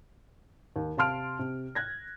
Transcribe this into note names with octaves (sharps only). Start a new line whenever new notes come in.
D#2
C3 F5 A5 C6 F6 D7
C3
F#6 G#6 A#6